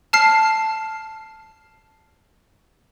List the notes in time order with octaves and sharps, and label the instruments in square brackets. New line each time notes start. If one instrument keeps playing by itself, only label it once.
[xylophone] A5 F6 C7